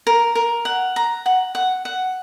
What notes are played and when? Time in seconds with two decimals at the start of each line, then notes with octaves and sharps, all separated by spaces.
0.07 A#4
0.35 A#4
0.65 F#5
0.96 A#5
1.26 F#5
1.55 F#5
1.85 F#5